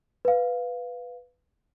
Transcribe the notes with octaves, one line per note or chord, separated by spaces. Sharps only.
B4 F5